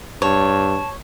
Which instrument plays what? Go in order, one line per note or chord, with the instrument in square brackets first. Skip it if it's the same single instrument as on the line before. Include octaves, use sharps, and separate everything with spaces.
[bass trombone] G2 [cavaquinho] C#5 [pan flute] A5